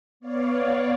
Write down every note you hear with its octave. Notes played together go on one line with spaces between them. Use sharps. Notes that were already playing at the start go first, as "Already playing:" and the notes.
B3 C#5 D5 F5